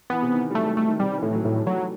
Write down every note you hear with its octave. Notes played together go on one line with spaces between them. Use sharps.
E3 B3
C3
D#3
G3
F#3 A3
G3
D#3 A3
D#3
C3 G3
D#3
E3
A2 D#3
F#3
A2 G3
F#3 A3